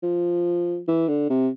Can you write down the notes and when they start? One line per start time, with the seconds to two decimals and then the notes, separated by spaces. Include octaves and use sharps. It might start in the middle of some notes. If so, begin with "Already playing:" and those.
0.03 F3
0.88 E3
1.08 D3
1.30 C3